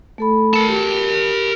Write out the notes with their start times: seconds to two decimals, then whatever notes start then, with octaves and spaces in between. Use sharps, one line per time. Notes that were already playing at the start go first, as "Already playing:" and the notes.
0.18 A3 A4 B5
0.54 A#4 A5
0.69 G4